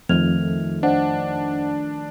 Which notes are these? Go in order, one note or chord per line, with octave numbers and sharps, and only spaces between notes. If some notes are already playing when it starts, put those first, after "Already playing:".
F2 D#3 F3 A3 F6 G#6 F7
D4 C5 D#5 F#5